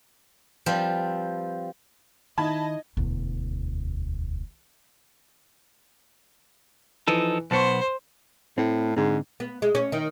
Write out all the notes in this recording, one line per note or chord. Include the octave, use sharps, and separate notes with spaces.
F3 G3 C4 B4
D#3 D#4 E4 D#5 A5 B5 G#6
E1 D2
E3 F3 D#4 A4
B1 B3 C5 A5 C6 C#6
A2 C4
G#2 D3 C4
B3
G#3
C#4
D#3